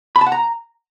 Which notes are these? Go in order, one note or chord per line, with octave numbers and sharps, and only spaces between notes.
B5
A5
F#5
A#5